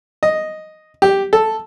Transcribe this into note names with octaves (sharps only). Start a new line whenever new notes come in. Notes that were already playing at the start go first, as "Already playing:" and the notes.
D#5
G4
A4